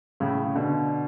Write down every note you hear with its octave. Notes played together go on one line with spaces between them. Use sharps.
A2 C#3
C#3
B2 D3